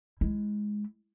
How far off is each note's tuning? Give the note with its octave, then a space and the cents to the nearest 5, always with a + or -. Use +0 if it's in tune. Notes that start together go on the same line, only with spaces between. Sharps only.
G#3 +0 E4 +0